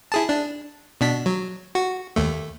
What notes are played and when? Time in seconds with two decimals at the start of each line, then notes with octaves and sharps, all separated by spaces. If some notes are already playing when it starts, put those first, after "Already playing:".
0.12 E4 G#4 A5
0.29 D4
1.01 B2 D4 B6
1.26 F#3
1.75 F#4
2.16 D#2 A3